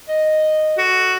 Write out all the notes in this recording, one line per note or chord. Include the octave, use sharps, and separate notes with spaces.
D#5
F#4 A4